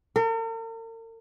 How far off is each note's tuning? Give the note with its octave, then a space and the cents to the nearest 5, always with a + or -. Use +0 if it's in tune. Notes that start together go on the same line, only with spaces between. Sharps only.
A#4 -45